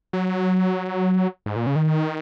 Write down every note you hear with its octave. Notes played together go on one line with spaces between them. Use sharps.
F#3
G#2
A#2
C#3
D#3